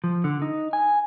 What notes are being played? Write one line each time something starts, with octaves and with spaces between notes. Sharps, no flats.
F3
D3
D#4
G#5